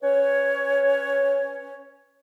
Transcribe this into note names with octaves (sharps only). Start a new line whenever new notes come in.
C#4 B4 C#5